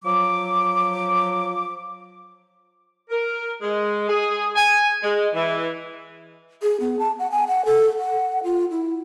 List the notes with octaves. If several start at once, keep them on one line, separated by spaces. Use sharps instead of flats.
F3 F#3 D6
A#4
G#3
G#4
G#5
G#3
E3
G#4
B3
A5
F#5
G#5
F#5
A4
F#5
F4
E4